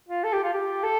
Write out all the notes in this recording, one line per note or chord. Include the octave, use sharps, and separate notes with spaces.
F4
A4
G4
F4
G4
A4